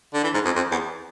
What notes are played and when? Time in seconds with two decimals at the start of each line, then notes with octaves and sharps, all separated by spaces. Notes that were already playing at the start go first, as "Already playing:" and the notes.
0.14 D3
0.24 E3
0.34 G#2
0.45 F2
0.56 F2
0.72 E2